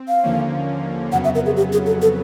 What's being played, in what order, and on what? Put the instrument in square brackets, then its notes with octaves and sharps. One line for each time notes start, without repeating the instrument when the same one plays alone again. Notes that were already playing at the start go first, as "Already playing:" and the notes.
Already playing: [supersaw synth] C4
[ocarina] F5
[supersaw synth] D#2 D3 F3 A#3 C#4
[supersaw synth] F2 C#3 F#3 B3 [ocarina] F#5
[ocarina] E5
A#4
G#4
G4
G#4
A4
A4